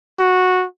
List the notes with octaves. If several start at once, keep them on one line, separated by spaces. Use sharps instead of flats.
F#4